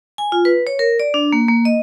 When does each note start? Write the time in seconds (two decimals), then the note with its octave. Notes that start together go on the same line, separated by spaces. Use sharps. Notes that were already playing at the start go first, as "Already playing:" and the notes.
0.18 G#5
0.32 F4
0.45 B4
0.67 C#5
0.79 A#4
1.00 D5
1.14 D4
1.33 A#3
1.48 A#3
1.65 D#5